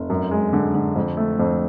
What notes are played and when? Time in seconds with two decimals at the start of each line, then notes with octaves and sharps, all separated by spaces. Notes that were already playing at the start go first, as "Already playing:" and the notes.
Already playing: F1
0.10 F#2
0.31 G#3
0.53 D3
0.75 D3
0.96 F2
1.17 A3
1.40 F2